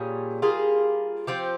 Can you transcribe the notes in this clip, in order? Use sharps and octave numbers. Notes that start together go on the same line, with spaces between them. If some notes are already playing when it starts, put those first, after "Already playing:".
Already playing: A#2 G3 C#4 G#4
G3 A#3 F4 G#4
F3 C4 G4